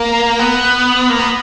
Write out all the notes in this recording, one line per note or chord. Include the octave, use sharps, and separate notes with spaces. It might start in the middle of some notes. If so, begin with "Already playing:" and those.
Already playing: A#3
B3
A#3
B3